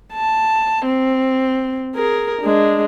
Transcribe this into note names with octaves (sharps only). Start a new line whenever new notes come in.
A5
C4
G#4 A#4
G#3 D4